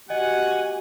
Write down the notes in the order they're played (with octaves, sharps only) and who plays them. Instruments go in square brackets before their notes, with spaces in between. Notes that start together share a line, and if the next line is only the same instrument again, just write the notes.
[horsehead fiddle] F#4 G4 [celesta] D#5 [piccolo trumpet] F#5 [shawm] G#5